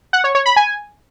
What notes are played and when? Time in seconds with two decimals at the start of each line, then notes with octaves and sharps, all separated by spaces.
0.13 F#5
0.24 C#5
0.35 C#5
0.46 B5
0.56 G#5